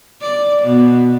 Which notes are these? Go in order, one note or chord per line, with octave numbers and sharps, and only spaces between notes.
D5
B2